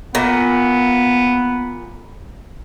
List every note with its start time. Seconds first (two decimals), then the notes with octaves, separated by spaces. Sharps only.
0.15 A#2 B3